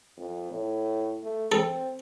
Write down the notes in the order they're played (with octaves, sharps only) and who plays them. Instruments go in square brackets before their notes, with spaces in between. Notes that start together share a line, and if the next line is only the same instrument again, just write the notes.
[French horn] F2
A2
A3
[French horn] C4 [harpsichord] A4